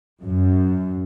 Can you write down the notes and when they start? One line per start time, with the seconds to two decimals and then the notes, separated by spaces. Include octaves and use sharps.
0.23 F#2